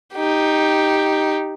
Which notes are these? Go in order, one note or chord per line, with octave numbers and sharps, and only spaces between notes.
D#4 G4